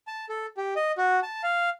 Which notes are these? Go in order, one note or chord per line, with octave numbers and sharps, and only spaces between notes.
A5
A4
G4
D#5
F#4
A5
F5